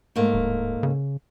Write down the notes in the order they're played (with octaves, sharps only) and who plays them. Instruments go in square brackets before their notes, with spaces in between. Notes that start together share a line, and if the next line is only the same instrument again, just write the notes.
[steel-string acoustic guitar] G#2 A3 A#3
[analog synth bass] D1
C#3